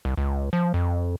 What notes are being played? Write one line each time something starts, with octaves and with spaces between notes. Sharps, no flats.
C2
C#2
F3
F2